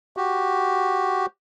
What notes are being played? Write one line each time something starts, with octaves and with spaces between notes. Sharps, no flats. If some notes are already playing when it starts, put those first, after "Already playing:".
F#4 G4